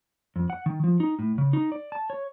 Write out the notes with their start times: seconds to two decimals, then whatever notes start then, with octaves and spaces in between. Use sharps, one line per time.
0.36 F2
0.50 F#5
0.66 D#3
0.84 F3
1.00 D#4
1.19 A2
1.38 C#3
1.53 D#4
1.72 D5
1.92 A5
2.10 C#5